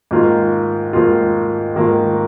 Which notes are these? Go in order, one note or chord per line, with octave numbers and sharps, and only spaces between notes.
G#2 D#3 A#3 F4
G#2 D#3 A#3 F4
G#2 D#3 A#3 F4